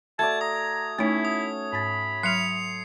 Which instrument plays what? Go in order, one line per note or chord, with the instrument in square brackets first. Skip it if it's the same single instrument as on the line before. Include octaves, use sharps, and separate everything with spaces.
[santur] A3 F#4 D5 [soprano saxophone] A5 [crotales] G#6
[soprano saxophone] A#5 [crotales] D#6
[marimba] A3 D#4 [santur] C#4 C#5 [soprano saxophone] E4
[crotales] D#6
[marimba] G#2 A6 [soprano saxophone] B5
[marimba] F#3 F6 [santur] C6 [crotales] C7 C#7 F7